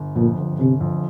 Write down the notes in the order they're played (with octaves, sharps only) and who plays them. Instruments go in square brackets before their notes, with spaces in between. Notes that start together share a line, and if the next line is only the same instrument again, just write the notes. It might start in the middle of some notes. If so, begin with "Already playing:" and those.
Already playing: [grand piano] G1
[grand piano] F2 [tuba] A#2
[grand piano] G1
[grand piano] G1 [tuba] C3
[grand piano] F2